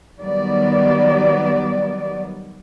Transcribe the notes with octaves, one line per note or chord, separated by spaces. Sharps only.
D#3 F#3 G3 B3 D5